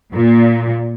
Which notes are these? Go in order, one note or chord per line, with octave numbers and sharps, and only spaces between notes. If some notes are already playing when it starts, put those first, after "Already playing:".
A#2